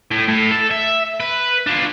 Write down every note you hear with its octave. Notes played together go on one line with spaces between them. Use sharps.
A2
A2
A4
E5
B4
D4 F4